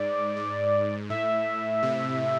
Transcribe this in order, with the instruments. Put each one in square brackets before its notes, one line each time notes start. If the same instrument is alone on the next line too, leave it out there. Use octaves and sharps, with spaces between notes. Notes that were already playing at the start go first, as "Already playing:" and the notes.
Already playing: [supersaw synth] G#2 [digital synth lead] D5
[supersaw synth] G#2
[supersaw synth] A2 [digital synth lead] E5
[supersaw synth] C3